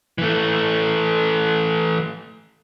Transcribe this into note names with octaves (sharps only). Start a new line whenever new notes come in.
E3 A3